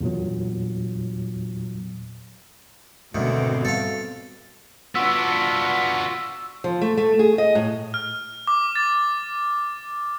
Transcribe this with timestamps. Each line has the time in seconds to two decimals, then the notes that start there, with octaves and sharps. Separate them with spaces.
0.01 E2 A#2 F#3
3.15 D2 G#2 B2 D#3 C4
3.65 G3 A4 F5
4.95 B3 D4 F4 F#4 E6
6.64 F3
6.82 A3
6.97 A3
7.19 G#4
7.38 D#5
7.55 A2
7.94 F6
8.47 D6
8.76 A6